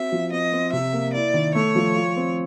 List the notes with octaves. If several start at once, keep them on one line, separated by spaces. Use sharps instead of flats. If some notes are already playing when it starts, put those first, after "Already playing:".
Already playing: C4 F#4 E5
F3
C4 D#5
C4
C3 E5
A#3
E4 D5
D#3
A3 C#5
F3
F4
C4